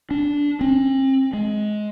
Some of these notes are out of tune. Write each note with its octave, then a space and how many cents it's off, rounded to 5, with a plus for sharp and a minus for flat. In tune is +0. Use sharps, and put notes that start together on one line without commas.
D4 -15
C4 +40
G#3 +20